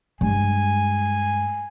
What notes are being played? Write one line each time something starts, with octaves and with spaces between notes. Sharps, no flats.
G2 G#3 G#5